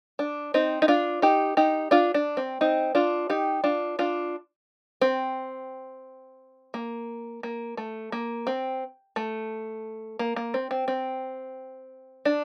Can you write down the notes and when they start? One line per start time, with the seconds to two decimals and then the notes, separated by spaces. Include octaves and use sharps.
0.19 D4
0.54 C4 D#4
0.82 D#4
0.88 D4 F4
1.22 D#4 G4
1.57 D#4 G4
1.91 D4 F4
2.14 D4
2.37 C4
2.61 C4 D#4
2.95 D4 F4
3.30 D#4 G4
3.64 D4 F4
3.99 D4 F4
5.01 C4
6.74 A#3
7.43 A#3
7.77 A3
8.12 A#3
8.47 C4
9.16 A3
10.19 A#3
10.36 A#3
10.54 C4
10.71 C4
10.88 C4
12.25 D4